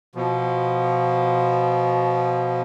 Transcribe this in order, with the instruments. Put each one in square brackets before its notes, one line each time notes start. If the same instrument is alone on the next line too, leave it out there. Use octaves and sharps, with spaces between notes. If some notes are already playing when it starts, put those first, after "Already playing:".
[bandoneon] B2 F3